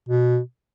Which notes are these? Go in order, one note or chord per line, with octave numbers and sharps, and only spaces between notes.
B2